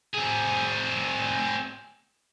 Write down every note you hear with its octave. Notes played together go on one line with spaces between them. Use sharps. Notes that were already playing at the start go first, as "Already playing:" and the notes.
C4 G#4